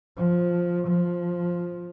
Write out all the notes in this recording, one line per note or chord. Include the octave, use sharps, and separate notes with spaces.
F3
F3